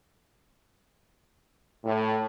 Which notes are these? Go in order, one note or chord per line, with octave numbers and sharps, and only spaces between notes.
A2